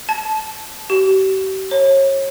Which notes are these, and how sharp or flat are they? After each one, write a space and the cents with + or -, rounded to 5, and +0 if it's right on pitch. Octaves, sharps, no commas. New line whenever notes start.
A5 -15
G4 -40
C#5 -30